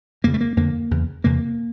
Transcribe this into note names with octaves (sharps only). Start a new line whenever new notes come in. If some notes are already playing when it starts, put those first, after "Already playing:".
F2 C#3 A#3
A3
A#3
F2 D3 A#3
E2 C#3
E2 C3 A#3